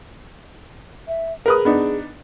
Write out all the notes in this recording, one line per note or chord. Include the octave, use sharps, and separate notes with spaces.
E5
G#4 A#4 B4 D#6
B3 D4 D#4